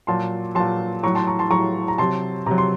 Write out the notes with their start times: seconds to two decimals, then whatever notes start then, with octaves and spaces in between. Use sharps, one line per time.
0.07 A#2 F#3 A5 C6
0.55 A#2 F#3 A5 C6
1.03 A2 F#3 A#5 C#6
1.15 A5 C6
1.27 A#5 C#6
1.39 A5 C6
1.51 A2 F#3 A#5 C#6
1.88 A#5
1.98 C3 F#3 A5 C6
2.46 C3 F#3 A#5
2.58 C6